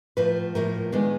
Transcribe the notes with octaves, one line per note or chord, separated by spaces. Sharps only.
A2 F3 A#3 B4
A2 F3 A#3 A#4
D#3 G#3 B3 D4